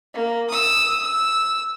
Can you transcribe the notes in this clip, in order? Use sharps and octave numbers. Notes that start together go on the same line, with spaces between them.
A#3
D#6 E6
E6